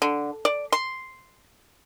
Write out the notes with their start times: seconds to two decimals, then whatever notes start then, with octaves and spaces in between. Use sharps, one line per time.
0.02 D3
0.45 D5
0.72 C6